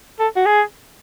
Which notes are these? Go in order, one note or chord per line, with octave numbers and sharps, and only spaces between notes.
A4
F#4
G#4